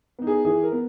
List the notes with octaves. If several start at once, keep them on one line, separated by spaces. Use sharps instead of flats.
B3 D#4
G#4
E3 G#4
A#4
B3